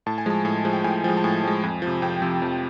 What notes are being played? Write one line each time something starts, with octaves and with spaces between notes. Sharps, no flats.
A2 A5
G#5
F3 G#3 A5
A2 G#5
F3 G#3
G5
A2 G#5
F3 G#3
A5
A2 G#5
F3 G#3
F2
F3
C3
F2 G5
C3 F3
F2